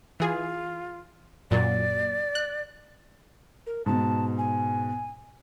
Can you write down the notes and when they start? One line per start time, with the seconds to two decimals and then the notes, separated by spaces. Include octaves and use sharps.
0.20 E3 F4 G#4
1.51 F#2 A#2 F#3 D5
2.35 F#6
3.67 A#4
3.86 G#2 B2 A5
4.38 G#5